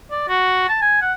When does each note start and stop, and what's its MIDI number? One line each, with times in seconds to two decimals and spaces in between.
0.11 0.27 74
0.28 0.64 66
0.69 0.79 81
0.82 0.97 80
1.01 1.13 78